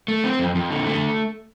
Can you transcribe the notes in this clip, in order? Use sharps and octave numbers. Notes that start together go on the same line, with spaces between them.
A3
C4
F2
F2
D3
A3